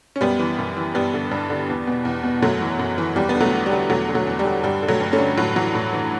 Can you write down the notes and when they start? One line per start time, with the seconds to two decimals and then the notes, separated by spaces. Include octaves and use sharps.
0.16 C#4
0.21 F#2 G3 B3
0.39 E3
0.58 F#2
0.77 E3
0.95 G2 G3 B3
1.14 D3
1.31 G2
1.50 D3
1.69 E2
1.87 B2
2.05 E2
2.24 B2
2.42 F#2 F#3 A3
2.61 E3
2.79 F#2
2.98 E3
3.16 E2 G3
3.29 B3
3.35 D3
3.40 F#3 A3
3.53 E2
3.66 G3
3.71 D3
3.90 E2 F#3 A3
4.08 D3
4.15 F#3 A3
4.27 E2
4.39 G3
4.45 D3
4.63 G2 G3
4.82 D3
4.88 F#3 A3
5.01 G2
5.12 A3 C#4
5.19 D3
5.37 A2 F#3
5.56 E3 F#3
5.75 A2
5.93 E3